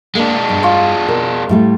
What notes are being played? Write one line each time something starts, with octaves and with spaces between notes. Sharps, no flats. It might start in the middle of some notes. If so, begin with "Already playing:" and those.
G#3 A#3 D4
G2
F4 C#6
B2 A#4
A2 G3 A3